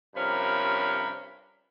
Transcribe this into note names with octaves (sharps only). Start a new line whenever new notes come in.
G2 C3 F3 C#4 A#4 B5